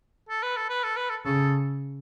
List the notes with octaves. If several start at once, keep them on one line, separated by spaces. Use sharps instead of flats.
A4
B4
A4
B4
A4
B4
A4
C#3 A4